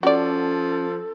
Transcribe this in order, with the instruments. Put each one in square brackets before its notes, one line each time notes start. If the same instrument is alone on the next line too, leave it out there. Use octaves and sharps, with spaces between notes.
[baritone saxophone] F3 [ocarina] C#4 [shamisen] F#4 D5 [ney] A4